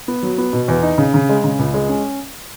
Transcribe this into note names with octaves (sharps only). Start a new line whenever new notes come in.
B3
F#3
B3
B2
E2
D#4
C#3
C#3
G#3
C#3
C#2
G#3
C#4